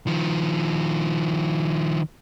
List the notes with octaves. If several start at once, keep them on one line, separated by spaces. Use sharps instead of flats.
D#3 F3